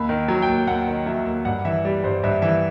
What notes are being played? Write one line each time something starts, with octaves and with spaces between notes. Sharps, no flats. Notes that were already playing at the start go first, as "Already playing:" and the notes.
Already playing: D#2 B5
D#3
F#3
G5
D#2
D#2 F#5
D#3
F#3 E5
D#2
G2 F#5
E3 E5
G3
G2 C5
G2 E5
E3 E5